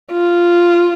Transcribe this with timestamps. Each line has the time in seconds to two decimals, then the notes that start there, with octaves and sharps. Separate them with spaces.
0.12 F4